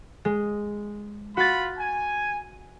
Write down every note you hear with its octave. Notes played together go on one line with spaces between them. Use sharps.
G#3
F4 F#4 B5 A6
G#5